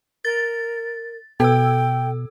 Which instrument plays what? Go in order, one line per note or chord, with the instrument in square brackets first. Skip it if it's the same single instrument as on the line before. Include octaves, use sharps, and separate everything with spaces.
[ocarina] A#4 [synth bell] A6
[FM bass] B2 [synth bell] A4 E6 [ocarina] G5